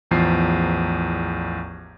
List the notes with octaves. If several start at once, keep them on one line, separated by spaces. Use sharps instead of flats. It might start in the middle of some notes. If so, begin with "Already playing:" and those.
A1 E2 F3 C7